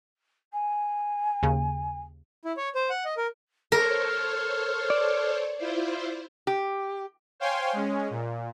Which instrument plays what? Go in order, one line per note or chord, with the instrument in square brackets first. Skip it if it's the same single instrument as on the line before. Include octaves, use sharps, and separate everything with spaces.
[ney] G#5
[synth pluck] D#2 C#3
[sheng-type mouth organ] E4
C#5
C5
F#5
D#5
A#4
[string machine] A4 C5 C#5 [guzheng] A#4 [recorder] F6
[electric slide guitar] D5
[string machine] E4 F4 C5
[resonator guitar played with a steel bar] G4
[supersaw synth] C5 C#5 F5 G5 G#5 C6
G#3 C#4
A#2